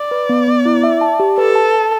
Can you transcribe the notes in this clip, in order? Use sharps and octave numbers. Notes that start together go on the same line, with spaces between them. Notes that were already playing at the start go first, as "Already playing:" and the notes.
Already playing: D5
B4
B3
B3
E4
E5
A5
G4
A4 B4
A5
A5